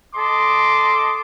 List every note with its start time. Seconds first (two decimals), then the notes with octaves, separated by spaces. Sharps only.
0.15 A4 D#5 C6 D6